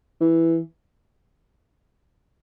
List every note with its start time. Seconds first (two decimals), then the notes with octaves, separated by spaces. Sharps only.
0.21 E3